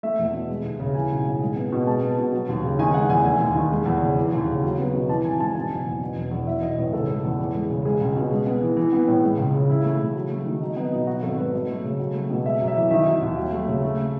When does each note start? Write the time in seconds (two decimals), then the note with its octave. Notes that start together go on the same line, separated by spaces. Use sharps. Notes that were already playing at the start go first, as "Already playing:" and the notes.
0.03 A3 E5
0.19 E2
0.33 B2
0.49 G#3
0.64 D#2
0.80 C#3
0.95 E3 G#5
1.11 B1
1.25 A2
1.41 G#3
1.56 B3
1.72 B2
1.87 G#3 A5
2.02 B3
2.18 B2
2.33 F#3
2.49 D#2
2.63 C#3
2.79 D#3 G#5
2.94 G#3 F#5
3.09 E2 G#5
3.25 A3 G#5
3.40 D#2
3.55 D#3
3.71 G#3
3.86 E2
4.01 C#3
4.17 E3
4.33 D#2
4.47 C#3
4.63 F#3
4.78 B3
4.94 B2
5.09 E3 A5
5.25 G#1 G#5
5.40 G#2 A5
5.55 B2 G#5
5.70 F#1
5.85 E2
6.01 B2
6.16 E1
6.31 E2
6.47 E3 E5
6.62 B1 D#5
6.78 A2 B4
6.93 C#3 A4
7.09 G#3
7.24 E2
7.39 E3
7.54 G#3
7.70 C#3
7.85 G#3 G#4
8.01 C#2
8.16 B2
8.31 G#3
8.47 B3
8.62 E3
8.77 E3
8.93 B3
9.07 A2
9.23 G#3
9.38 C#2
9.54 C#3
9.69 E3 E4
9.84 A3
9.99 C#3
10.15 F#3
10.31 A3
10.45 D#3
10.61 F#3 D#4
10.76 B3 D#4
10.92 B2 D#4
11.07 F#3 F#4
11.23 G#1 A4
11.38 G#2 B4
11.53 F#3 D#5
11.69 A3
11.84 C#3
11.99 F#3
12.14 A3
12.30 B2
12.45 G#3 E5
12.60 F#2
12.68 E5
12.76 E3
12.91 D#3 E5
13.06 F#3
13.22 D#2
13.37 F#3
13.52 A3
13.68 C#3
13.83 A3